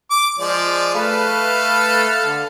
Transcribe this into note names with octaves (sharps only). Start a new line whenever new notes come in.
D6
F3 G#3 D5
A3 A4 B4 F5
D3